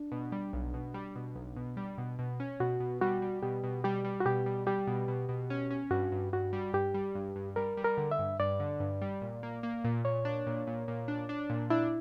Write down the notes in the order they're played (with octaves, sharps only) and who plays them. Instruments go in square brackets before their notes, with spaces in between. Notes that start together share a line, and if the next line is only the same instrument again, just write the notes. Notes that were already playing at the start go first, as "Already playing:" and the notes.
Already playing: [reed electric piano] D4
[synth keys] B2
G3
B1
B2
G3
B2
B1
B2
G3
B2
B2
C#4
[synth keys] B2 [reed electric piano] F#4
[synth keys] B2
[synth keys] G3 [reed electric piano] F#4
[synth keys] G3
[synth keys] B2 [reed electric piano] G4
[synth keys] B2
[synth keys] G3 [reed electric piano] G4
[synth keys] G3
[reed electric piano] F#4
[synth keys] B2 [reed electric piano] G4
[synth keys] G3
[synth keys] G3 [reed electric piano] G4
[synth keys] B2
B2
B2
C#4
C#4
[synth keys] G2 [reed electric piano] F#4
[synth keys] G2
[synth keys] G2 [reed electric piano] F#4
[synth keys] G3
[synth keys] G2 [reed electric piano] G4
[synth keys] G3
G2
G2
[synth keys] G3 [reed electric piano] A#4
[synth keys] G3
[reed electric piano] A#4
[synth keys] D3
[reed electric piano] E5
[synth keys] G2
[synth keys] G2 [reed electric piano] D5
[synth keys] D3
G2
G3
A#2
A#3
A#3
A#2
[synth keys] A#2 [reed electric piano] C#5
[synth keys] D4
A#2
A#2
A#2
D4
D4
A#2
[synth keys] D4 [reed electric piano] E4